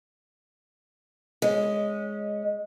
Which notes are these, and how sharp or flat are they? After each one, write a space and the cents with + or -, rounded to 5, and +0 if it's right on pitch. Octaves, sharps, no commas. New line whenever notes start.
G#3 +0 C#4 +0